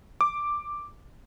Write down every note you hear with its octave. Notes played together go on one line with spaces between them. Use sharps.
D6